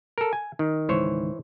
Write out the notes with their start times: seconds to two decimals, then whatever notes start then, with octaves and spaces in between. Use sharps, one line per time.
0.18 A4 A#4
0.33 G#5
0.59 D#3
0.89 C#2 G#2 D#3 E3 C5 C#5